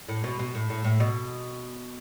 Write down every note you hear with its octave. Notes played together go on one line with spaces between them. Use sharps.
A2
B2
B2
A2
A2
A2
B2